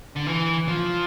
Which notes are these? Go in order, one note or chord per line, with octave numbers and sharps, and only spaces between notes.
D3
E3
F3